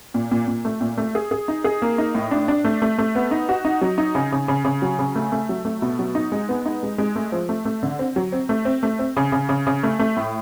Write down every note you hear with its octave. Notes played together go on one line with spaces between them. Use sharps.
A#2
A#2
A#2
A3
A#2
A3
G#4
G#4
D#4
G#4
A#3
D#4
A2
D4
D4
A3
A3
A3
B3
D#4
F#4
D#4
F#3
D#4
C#3
C#3
C#3
C#3
F#3
C#3
A3
A3
F#3
A3
B2
F#3
D#4
G#3
B3
D#4
G#3
G#3
A3
F3
A3
A3
D3
C4
F#3
C4
A3
C4
A3
C4
C#3
C#3
C#3
C#3
A3
A3
A2